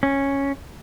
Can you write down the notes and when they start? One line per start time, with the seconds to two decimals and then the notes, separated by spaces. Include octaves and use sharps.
0.03 C#4